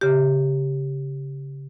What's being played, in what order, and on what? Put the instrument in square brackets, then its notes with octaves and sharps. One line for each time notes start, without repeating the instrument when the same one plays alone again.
[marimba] C#3 G4